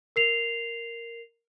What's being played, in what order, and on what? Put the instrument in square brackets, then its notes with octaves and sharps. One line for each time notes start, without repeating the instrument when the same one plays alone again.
[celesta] A#4 C7 F7